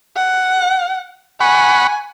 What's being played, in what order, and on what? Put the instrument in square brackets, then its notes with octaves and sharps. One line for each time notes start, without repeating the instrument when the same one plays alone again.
[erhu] F#5
[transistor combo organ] F#5 B5 C#6 [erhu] G#5